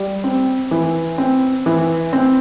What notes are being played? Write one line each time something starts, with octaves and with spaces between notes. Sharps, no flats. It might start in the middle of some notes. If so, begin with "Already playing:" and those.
Already playing: G3
C4
E3
C4
E3
C4